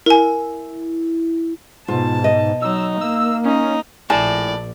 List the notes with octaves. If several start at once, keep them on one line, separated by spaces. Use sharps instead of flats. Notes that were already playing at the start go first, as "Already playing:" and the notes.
E4 A#4 G#5
G#2 B2 F4 A5
D#5
F#3 D#4 E6
A#3 E6
C#4 D#4
A#1 A2 D5 G#5 A5